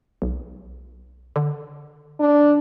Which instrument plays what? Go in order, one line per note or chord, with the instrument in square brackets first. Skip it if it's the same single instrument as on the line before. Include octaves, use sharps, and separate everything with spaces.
[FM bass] B1
D3
[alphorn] D4